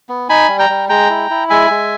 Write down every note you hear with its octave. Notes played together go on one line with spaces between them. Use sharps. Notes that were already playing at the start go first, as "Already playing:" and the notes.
B3
D#4 G#5 B5
G3
G5 A#5
G3
G#3 G5 A#5
E4
E4
G#3 E5 G#5
G#3